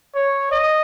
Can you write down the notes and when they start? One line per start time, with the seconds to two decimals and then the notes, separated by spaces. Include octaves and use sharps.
0.15 C#5
0.52 D#5